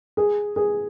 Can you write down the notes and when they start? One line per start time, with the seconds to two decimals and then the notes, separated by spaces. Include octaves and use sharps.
0.17 G#4
0.56 G#4